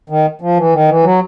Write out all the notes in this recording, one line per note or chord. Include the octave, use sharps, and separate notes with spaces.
D#3
F3
E3
D#3
E3
F#3